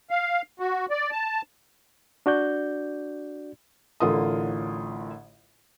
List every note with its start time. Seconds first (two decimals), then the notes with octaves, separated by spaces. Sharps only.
0.11 F5
0.60 F#4
0.91 D5
1.12 A5
2.26 D4 F#4 D5 G6
4.00 A1 A2 D3 F4 A#4 D#6